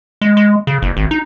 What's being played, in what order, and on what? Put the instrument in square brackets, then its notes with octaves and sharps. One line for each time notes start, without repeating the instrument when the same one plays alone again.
[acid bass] G#3
G#3
C#3
F#1
G#1
D#4